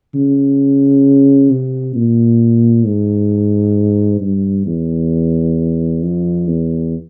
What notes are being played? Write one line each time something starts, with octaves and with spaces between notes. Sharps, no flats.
C#3
C3
A#2
G#2
G2
E2
F2
E2